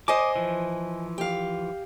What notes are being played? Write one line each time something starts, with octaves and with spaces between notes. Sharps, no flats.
C5 D#5 G#5 D6 D#6
E3 F3
G4 F5